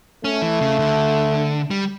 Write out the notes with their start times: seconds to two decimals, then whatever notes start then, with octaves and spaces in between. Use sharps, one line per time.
0.24 A3 C#4
0.42 E3
0.61 C#3
0.79 D3
1.71 G3